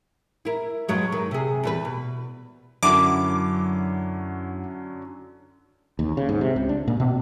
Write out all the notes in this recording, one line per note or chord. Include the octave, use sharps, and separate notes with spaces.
E4 A#4
G2 F#3 G#3
D#3
C3 G#4
E2 G3 B4
B2
F#2 D3 F#3 C#4 D4 E4 D6
D#2
C#3
G#2
C3
C#2
D4
A#2
B2